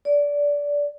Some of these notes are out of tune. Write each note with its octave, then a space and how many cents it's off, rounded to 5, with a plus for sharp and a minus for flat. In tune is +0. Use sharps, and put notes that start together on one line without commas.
D5 -20